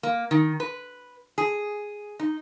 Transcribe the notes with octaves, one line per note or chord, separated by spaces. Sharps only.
A#3
D#3
B4
G#4
D#4